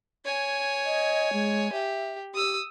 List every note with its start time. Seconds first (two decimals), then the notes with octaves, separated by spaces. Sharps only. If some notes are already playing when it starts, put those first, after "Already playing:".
0.25 C#5 G#5
0.85 D#5
1.33 G#3
1.72 G4 E5
2.34 G4 D#6 E6